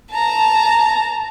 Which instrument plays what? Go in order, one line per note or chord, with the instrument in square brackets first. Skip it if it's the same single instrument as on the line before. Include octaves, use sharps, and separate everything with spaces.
[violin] A5 A#5